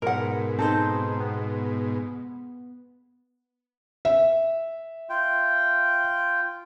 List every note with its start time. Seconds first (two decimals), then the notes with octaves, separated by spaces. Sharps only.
0.02 G#2 B2 A#4 F#5
0.59 C4 D#4 A4 C5
1.20 B3
4.05 E5
5.10 F4 G5